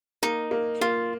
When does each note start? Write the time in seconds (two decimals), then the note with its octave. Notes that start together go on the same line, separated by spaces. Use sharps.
0.23 A#3 D#4
0.51 A#3
0.81 A#3 F4